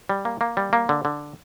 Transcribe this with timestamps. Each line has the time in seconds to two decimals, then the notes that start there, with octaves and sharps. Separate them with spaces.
0.09 G3
0.25 A#3
0.41 A#3
0.57 G3
0.73 A#3
0.89 D3
1.05 D3